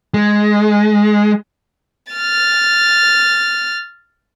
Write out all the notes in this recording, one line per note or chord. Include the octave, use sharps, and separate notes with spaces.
G#3
F6 A6